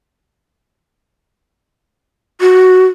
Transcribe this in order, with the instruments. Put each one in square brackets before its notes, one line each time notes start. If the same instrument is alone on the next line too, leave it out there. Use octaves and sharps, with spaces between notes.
[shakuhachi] F#4